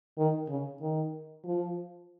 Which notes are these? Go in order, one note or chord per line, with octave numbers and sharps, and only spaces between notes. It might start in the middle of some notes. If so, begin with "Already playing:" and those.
D#3
C#3
D#3
F3